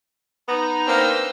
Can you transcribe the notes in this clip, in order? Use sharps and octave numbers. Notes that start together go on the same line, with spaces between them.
B3 D#4 A#5 A#6
A#3 C4 D4 B4 C5 E6